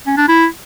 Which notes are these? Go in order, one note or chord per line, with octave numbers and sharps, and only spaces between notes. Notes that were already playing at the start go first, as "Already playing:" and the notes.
C#4
D4
E4